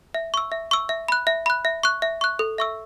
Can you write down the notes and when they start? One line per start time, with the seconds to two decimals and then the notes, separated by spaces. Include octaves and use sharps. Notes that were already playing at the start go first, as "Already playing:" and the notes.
0.14 E5
0.34 C#6 E6
0.52 E5
0.71 C#6 E6
0.89 E5
1.08 B5 F#6
1.27 E5
1.46 B5 F#6
1.65 E5
1.83 C#6 F#6
2.02 E5
2.21 C#6 F#6
2.39 A4
2.58 E5 C#6 E6